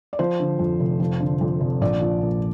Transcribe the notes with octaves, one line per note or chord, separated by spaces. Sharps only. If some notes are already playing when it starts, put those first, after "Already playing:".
D5
F3 C5
D3
F2
F1
F3
D3
F2
F1
A#1 D5
F3
A#2